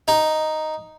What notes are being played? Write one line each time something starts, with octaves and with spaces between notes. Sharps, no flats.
D#4